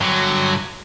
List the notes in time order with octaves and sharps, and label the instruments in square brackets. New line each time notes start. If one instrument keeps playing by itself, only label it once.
[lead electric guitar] G2 D3 [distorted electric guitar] F#3